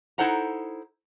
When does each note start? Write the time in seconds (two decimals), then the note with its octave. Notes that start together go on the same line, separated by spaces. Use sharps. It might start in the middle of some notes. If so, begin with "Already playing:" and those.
0.18 D#4 E4 A4 C5 F#5 A#5